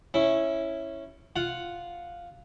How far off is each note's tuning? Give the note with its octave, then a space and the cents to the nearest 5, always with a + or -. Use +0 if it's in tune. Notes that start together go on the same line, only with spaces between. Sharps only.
C#4 -10 E4 +0
F4 +0 F#5 +0